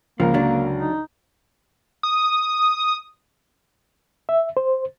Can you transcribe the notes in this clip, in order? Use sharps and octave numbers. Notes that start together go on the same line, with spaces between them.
C#2 F3 A#3 A#4 A#5
D3 F#3 D4
D#4
D#6
E5
C5